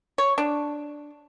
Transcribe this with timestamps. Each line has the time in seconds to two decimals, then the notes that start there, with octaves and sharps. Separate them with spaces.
0.18 C#5
0.38 D4